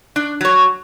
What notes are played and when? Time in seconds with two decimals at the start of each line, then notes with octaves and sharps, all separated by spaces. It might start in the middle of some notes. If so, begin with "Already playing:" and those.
0.16 D4
0.41 F#3 C#5